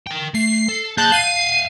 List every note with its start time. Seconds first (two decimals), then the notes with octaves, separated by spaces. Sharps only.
0.07 A#4 G5
0.34 A3 C7
0.69 A4
0.97 A#3 G#4 A5 F#6 G6
1.12 E5 F5 C7 D#7